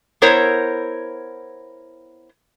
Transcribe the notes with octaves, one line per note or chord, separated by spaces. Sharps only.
B3 E4 A#4 C5 C#5